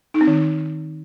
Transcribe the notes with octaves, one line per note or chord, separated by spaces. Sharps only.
D#4
C4
D#3